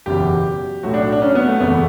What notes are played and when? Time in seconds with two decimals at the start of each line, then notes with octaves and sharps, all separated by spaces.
0.06 F#1 E2 B2 G4
0.83 B1 A2 F#3 A3 F#4
0.94 D4
1.12 D4
1.22 C#4
1.35 B3
1.47 A3
1.60 F#1 E2 B2 A3 B3